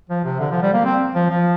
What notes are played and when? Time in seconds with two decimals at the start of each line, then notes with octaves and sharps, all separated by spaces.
0.10 F3
0.24 C3
0.40 D3
0.51 F3
0.62 G3
0.73 A#3
0.85 C4
1.15 F3
1.30 F3